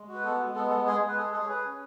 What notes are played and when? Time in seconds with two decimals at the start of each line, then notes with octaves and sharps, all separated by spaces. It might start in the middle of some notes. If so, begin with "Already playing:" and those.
Already playing: G#3
0.08 F#4
0.14 B4
0.23 B3 A4
0.40 G#3
0.55 B3 A4
0.70 G#3 A4
0.86 G#3 G#4
1.01 G#3
1.08 B4
1.17 G#4 A4
1.33 G#4 A4
1.44 C#5
1.48 G#4 B4
1.65 C#4